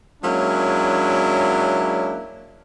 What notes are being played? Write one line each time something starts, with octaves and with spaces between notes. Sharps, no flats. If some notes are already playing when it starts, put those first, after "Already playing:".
F#3 G#3 A#3 C#4 D4 E4